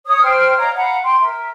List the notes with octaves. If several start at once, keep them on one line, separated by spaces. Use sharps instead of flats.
C#5 D#6
C5 G5 F6
C#5 D#5 F5 A#5
F5 F#5 A#5 B5
G5 C6
A#4 E5